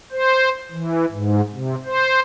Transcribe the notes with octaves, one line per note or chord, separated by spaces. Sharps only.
C5
E3
G#2
C3
C5